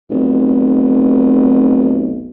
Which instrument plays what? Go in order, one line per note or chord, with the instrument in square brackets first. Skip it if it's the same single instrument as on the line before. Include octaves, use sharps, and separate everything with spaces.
[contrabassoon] F1 [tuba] B1